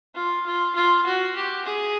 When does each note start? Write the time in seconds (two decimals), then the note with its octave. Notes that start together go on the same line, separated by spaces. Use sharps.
0.15 F4
0.46 F4
0.75 F4
1.06 F#4
1.36 G4
1.65 G#4